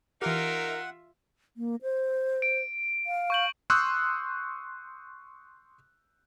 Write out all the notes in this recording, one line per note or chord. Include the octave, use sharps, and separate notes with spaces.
E3 D#4 F4 G4 A#4 E5 F#5
A#3
C5
D7
F5
C#6 G6 F#7
C6 C#6 D#6 E6 F#6 G6